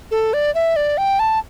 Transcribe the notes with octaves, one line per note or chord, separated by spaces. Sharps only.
A4
D5
E5
D5
G5
A5